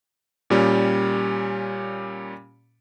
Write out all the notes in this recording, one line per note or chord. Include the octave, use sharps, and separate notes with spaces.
A#2 G3 C#4